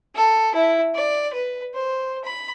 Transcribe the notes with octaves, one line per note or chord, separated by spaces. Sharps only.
A4
E4
D5
B4
C5
B5